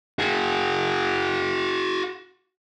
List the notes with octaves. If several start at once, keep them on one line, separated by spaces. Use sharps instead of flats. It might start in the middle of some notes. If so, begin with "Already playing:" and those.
F#4 G#4